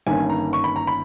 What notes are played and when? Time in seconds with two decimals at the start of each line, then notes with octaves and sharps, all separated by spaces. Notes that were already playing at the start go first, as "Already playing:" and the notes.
0.07 G1 G2 D#3 A#3 C#4 G#5
0.30 A#5
0.53 C#6
0.64 B5
0.76 A#5
0.87 B5